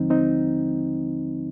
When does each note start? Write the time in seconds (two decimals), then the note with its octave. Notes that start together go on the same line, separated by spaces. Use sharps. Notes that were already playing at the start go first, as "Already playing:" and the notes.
Already playing: D#2 D3 F3 G#3 C4 D#4
0.10 C4 D#4